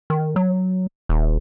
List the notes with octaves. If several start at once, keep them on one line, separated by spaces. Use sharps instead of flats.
D#3
F#3
D#1